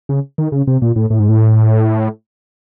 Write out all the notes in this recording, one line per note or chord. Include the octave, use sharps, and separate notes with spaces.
C#3
D#3
C#3
C3
A#2
A2
A2
G#2
A2